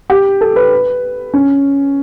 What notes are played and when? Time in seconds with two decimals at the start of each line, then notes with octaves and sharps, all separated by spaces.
0.10 G4
0.41 A4
0.56 B4
1.34 C#4